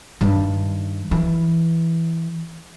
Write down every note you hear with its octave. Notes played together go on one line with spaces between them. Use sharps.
G2 D#3
E3